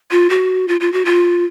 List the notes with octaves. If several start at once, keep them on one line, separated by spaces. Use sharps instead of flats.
F4
F#4
F4
F4
F#4
F4